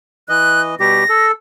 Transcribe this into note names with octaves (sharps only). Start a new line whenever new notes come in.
E3 D#5 F#6
B2 G3 G4 A#6
A4